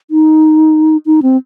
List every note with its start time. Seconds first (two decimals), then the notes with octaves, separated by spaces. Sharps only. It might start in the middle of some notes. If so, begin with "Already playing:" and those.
0.11 D#4
1.06 D#4
1.22 C4